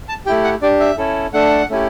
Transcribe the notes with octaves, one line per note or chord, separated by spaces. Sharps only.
A5
A3 E4 G4 G5
F#5
D4 G4 D5
E5
C#4 E4 A4
A3 D4 A4 F#5
A3 C#4 E4 G4